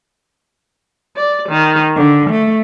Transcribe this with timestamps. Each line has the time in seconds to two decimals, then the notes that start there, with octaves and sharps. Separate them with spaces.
1.17 D5
1.49 D#3
1.96 D3
2.30 A3